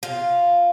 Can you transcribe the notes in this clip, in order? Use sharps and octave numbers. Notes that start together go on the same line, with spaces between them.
F4